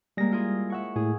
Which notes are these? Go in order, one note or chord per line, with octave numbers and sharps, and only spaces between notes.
G3 G#3 A#3 A#6
E4 F4 G#4
E5 F#5 C#6
A2 G#4